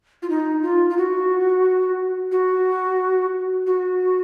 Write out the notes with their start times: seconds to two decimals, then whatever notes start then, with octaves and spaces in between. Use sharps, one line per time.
0.22 F4
0.30 D#4
0.63 F4
0.90 F4
0.98 F#4
2.32 F#4
3.67 F#4